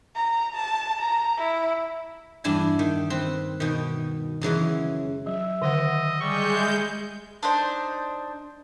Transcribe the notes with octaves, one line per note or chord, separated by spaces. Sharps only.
A#5
A5
A#5
E4
E2 G2 D4 E4 G#5
D#3
C4 B4
B2 D#3
F#2 C#3 E3 G#3
F#3 E5
D3 D#3 D#5 F#5
G3 G#3 C#6 G6
D4 D#4 C5